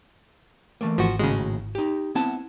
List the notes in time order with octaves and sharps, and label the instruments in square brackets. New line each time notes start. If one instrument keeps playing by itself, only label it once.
[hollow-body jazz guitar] E3 A3 A#3
[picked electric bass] G#1 [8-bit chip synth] F3 F#4
[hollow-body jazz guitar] D#2 A2 F#4 [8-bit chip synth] C#3 G#3
[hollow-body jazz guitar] D#4 G4
[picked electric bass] B3 C4 [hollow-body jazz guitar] E4 F#5 A5